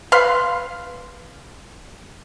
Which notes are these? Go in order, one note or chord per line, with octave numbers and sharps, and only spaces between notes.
B4 F5 C6